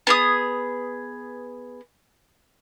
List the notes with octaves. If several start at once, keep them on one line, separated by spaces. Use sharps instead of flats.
B3 G#4 D#6